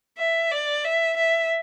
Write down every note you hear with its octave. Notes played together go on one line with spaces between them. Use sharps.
E5
D5
E5
E5